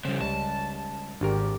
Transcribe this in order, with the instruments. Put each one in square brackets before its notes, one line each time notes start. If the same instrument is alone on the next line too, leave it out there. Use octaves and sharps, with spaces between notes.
[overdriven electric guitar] C#3 F3 [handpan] G3 C#4 [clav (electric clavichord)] C5
[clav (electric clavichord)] C#2 [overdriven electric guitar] A5
[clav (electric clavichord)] G#1 A#4 [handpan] D4 G4